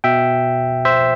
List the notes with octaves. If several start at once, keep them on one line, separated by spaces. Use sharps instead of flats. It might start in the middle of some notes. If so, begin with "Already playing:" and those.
B2 E5 G5
C5 E5